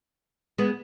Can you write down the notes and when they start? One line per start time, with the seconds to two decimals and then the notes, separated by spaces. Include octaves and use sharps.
0.58 G#3 B3